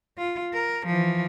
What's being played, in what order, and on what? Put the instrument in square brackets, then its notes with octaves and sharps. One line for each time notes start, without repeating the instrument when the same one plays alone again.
[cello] F4
A#4
E3 F3